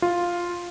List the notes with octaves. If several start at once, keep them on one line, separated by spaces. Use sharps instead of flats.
F4